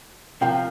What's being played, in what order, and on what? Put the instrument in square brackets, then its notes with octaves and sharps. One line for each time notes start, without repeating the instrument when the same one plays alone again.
[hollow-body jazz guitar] C3 F3 A#3 [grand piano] G5